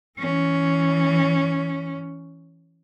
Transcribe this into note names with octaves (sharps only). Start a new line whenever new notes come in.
E3 C#4